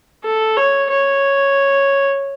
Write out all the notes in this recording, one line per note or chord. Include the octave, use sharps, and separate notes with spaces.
A4
C#5
C#5